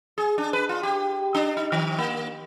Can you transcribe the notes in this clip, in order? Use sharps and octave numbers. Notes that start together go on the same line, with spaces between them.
G#4
D4
B4
F4
G4
D4
D#4
D#3
A#3